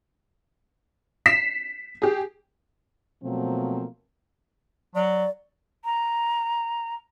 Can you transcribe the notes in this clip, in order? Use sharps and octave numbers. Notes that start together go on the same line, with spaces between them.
B6 C7 E7
G4 G#4
B2 F3 F#3 A3 A#3 C4
F#3 D5
A#5